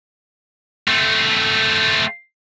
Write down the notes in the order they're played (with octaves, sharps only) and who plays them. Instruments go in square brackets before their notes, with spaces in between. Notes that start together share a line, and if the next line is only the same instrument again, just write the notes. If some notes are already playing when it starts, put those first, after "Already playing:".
[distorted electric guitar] A3 C4